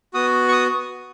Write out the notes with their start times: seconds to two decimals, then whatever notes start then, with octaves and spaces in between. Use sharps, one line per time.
0.14 B3 F#4 D#6
0.48 C#6
0.52 D#6